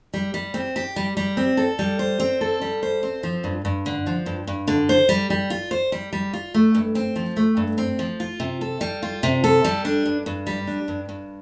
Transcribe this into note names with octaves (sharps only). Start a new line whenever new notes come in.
G3
G3
C4
G4
G3
G3
C4
A4
G3
C5
C4
A4
G3
C5
C4
F3
G2
G2
D3
F3
G2
G2
D3
C5
G3
G3
F4
C5
G3
G3
F4
A3
G2
C4
F3
A3
G2
C4
F3
F4
C3
A4
G3
F4
C3
A4
G3
D4
G2
G2
G3
D4
G2
G2